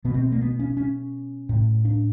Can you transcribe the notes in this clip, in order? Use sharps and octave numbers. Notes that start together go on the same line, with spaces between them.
B2 B3
C4
A#3
B3
C#4
C#4
A2
D4